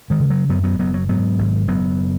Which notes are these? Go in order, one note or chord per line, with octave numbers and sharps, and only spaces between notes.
D#3 G#3
C#3
F#3
F#2 F#3 B3
F#3 B3
F#1 F#3 B3
F#3
G#2 F#3 B3
G#1
F#1 F#3 B3